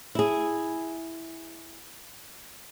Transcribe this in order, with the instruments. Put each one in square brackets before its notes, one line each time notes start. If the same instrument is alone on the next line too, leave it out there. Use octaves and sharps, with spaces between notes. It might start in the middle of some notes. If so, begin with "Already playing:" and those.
[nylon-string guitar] E4 G#4